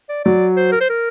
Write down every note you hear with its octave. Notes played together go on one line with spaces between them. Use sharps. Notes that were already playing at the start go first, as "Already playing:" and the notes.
D5
F#3 D5
C5
A#4
C5
A#4